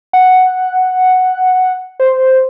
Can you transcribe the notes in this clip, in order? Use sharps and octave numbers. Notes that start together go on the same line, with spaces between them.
F#5
C5